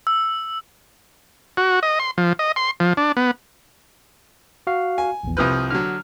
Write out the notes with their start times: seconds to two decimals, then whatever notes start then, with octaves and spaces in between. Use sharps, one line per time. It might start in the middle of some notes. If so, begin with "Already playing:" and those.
0.07 E6
1.57 F#4
1.83 D#5
2.00 C6
2.18 F3
2.39 D#5
2.56 C6
2.80 F3
2.97 D4
3.17 B3
4.67 F#4 F5
4.98 G#5
5.23 A#1 E2
5.37 C2 F3 B4 D#6 F6 G6
5.71 D3 F#3 F6